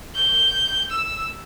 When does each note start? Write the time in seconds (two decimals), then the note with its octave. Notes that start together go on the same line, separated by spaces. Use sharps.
0.15 G6
0.90 E6